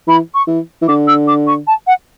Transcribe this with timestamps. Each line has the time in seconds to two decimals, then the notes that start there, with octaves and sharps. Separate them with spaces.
0.08 E3 B5
0.34 C#6
0.47 E3
0.82 E3
0.88 D3 D6
1.07 E6
1.28 D6
1.47 C#6
1.67 A5
1.87 F#5